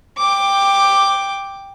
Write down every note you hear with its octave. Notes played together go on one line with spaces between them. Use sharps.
G5 D6